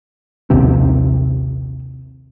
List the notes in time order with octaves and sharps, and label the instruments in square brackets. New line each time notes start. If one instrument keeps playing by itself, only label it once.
[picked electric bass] A#1 D#2 C3 C4